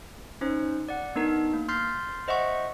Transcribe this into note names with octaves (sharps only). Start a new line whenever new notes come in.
C#4 D#4 C5
D5 F#5
B3 D4 D#4 A#4
A#3
C6 F6 G6 A6 B6 C7
C5 D#5 E5 F#5 C#6